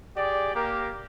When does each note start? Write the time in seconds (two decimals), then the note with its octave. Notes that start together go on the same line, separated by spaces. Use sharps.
0.17 G4 G#4 D5
0.55 A#3 G4 A#4